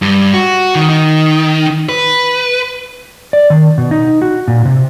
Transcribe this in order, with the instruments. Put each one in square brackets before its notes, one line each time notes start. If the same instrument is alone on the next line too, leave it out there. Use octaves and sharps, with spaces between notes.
[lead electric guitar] G2
F#4
D#3
D#3
B4
[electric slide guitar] D5
D#3
B2
D#4
F#4
A#2
C3